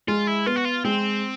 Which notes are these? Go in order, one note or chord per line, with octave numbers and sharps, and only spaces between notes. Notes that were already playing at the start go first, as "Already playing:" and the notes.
G#3 F4
E4
B3 F4
F#4
F4
G#3 C4